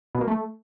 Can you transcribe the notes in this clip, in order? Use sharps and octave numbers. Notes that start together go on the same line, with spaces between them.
B2
A#3
A3